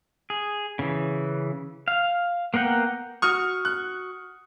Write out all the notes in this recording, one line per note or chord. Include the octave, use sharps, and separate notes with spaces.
G#4
C#3 E3
F5
A#3 B3 A#4 F#5 G5
F#4 C#6 D#6 F6
F#6